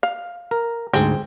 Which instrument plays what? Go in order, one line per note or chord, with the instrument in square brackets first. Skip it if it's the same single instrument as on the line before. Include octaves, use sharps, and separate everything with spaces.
[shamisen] F5
[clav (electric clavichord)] A#4
[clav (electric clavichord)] D2 G#2 [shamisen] C4 G#4